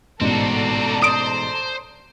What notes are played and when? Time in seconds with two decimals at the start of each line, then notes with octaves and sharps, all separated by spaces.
0.21 A1 G#2 B2 C4 F#4 A4 D5 A#5
1.02 C5 D#6 D7